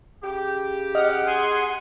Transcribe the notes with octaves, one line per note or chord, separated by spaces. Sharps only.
C#3 G4
D#5 F#5 F6
G#4 G#5 C6